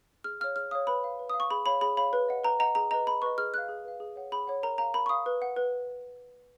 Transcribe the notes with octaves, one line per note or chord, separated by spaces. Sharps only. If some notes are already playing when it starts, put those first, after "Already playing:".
G#4 F6
C#5 F5 F6
G#4 F6
C#5 F5 D#6
B4 B5
F5
B4
F5 D#6
C#6
G#4 B5
C#5 F5 B5
G#4 B5
C#5 F5 B5
B4
D#5 F#5
B4 A#5
D#5 F#5 A#5
G#4 A#5
B4 D#5 A#5
G#4 B5
B4 D#5 C#6
G#4 F6
B4 F5 F#6
G#4
B4 F5
G#4
C#5 F#5
G#4 B5
C#5 F#5
A#4 A#5
F5 A#5
A#4 B5
C#6
F5 D#6
B4
F#5
B4